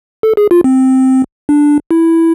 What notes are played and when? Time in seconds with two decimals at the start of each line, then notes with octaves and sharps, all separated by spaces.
0.23 A4
0.37 G#4
0.51 F4
0.64 C4
1.49 D4
1.91 E4